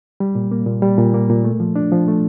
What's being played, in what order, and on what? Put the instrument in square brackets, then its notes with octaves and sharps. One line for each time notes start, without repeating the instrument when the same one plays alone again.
[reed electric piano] G3
A#2
A#3
A#2
G3
A#2
A#3
A#2
A3
F3
D4
F3
A3